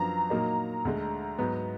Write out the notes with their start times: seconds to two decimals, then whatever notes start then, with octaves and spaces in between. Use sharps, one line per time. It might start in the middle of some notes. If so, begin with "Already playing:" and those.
Already playing: F#2 F3 B3 D4 F#4 A#5
0.30 A#2 F#3 A#3 D#4
0.85 D2 D3 G#3
1.39 G#2 F#3 B3